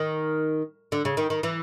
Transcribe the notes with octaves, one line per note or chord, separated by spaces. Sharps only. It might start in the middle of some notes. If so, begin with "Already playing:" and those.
Already playing: D#3
D3
C#3
D#3
D#3
E3